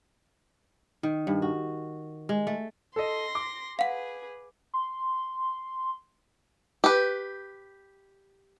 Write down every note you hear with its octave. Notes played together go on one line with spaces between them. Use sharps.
D#3
G2
F#4
G#3
A3
A4 D#5 C6 A#6
D6
G#4 B4 F5 F#5
C6
G4 B4